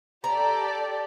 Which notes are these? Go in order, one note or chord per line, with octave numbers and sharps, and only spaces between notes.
G4 A4 D5 A#5